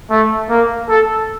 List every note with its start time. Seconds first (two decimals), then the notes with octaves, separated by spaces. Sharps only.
0.10 A3
0.49 A#3
0.89 A4